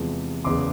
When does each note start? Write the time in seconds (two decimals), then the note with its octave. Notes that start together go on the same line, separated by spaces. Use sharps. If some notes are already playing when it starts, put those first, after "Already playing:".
Already playing: E2 C3 F3 G#3
0.44 F#1 E2 C#3 C6 D6